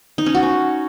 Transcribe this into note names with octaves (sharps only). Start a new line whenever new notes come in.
D#4
C#4
F#4
C#4